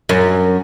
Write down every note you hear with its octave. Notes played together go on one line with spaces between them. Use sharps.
F#2